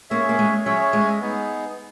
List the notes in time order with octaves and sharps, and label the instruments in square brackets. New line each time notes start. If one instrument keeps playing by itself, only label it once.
[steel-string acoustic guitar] A#3 [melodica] C#4 G#4 C#5 E5
[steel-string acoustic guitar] A#3
G#3
[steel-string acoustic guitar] F#3 [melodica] C#4 G#4 C#5 E5
[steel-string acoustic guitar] G#3
[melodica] B3 D#4 G#4